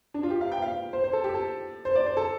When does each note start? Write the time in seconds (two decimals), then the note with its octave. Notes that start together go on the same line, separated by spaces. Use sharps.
0.14 D4
0.23 F4
0.30 G4
0.41 F5
0.52 G5
0.62 F5
0.93 C5
1.04 C5
1.13 A4
1.24 G4
1.34 A4
1.85 C5
1.95 D5
2.06 C5
2.17 A4